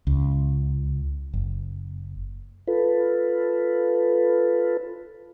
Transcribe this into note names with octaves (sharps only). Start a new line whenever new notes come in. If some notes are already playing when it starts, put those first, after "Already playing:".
C#2
F#1
F4 A4 B4